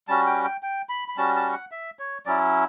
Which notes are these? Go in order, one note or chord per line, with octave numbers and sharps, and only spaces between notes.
G3 C#4 F#4 A5
G5
G5
G5
B5
B5
G3 C#4 F#4 A5
A5
F#5
E5
C#5
F#3 C#4 E4 D5